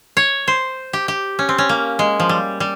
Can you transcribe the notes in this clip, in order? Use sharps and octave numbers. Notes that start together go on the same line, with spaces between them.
C#5
C5
G4
G4
C#4
C4
C#4
A#3
G#3
F3
G3
G3